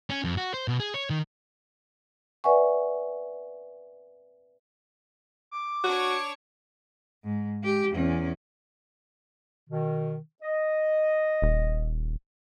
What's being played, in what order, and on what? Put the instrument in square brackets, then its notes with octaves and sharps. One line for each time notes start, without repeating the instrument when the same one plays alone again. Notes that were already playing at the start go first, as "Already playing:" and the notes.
[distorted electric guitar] C#4
F2
F#4
C5
B2
G#4
C#5
D#3
[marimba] B4 D5 E5 F#5 G#5 C#6
[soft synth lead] D6
[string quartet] D4 C#5 [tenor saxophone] F#4
[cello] G#2
G#3 G4
E2 C#4
[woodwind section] B2 D#3
D#5
[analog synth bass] D#1